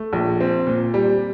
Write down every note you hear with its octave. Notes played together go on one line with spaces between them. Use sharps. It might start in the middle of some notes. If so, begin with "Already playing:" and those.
Already playing: A3
A#1
C4
A#2
G3